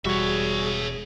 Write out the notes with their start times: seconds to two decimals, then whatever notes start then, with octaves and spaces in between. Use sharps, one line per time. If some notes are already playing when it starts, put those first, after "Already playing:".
0.05 E1 G3 F#4 G#4 C#5 E5 C#6